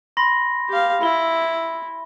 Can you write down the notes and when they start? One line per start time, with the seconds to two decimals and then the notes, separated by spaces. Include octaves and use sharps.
0.17 B5 C6 A#6
0.69 G4 F5
1.01 E4 B5 G7